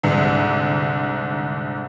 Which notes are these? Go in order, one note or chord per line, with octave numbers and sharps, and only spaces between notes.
C2 G#2 D3